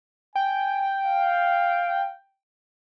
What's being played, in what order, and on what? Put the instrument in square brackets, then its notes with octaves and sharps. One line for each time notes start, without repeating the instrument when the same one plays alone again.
[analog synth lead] G5 [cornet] G#5
[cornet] F5